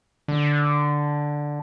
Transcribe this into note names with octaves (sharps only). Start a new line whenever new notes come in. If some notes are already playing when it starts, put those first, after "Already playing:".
D3